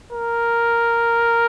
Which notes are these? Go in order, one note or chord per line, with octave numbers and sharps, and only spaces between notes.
A#4